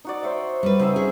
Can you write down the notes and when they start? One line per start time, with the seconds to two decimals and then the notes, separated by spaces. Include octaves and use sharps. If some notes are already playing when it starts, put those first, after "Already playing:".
0.05 D#4 F#4 D5
0.23 C5 C#5 E5
0.63 G3 B4
0.79 C#3 C4 D#4 E5
0.96 C#4 G#4